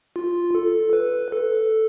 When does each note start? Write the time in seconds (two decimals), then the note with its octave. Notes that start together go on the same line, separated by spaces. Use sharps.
0.16 F4
0.55 A4
0.93 B4
1.32 A4